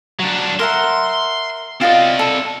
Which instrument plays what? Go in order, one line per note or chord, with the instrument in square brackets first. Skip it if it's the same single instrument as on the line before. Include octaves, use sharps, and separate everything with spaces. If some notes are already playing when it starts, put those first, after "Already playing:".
[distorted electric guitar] F#3 D4
[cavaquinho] A#4 E5 F#5 [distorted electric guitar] C6
[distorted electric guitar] C4 D5 [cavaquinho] F4 F#4 D#5
[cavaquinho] A4